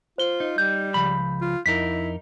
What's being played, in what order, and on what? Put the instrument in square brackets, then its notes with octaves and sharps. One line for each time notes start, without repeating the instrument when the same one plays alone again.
[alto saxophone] F4 [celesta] C5 G7
[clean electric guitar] D#4
[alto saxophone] G3 [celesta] G6
[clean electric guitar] C#2 F3 B5
[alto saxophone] F4
[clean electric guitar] F2 D#4 A#4 [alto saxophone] E4 [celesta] B6